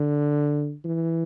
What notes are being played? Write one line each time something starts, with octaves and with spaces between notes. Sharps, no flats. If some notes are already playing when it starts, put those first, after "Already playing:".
Already playing: D3
E3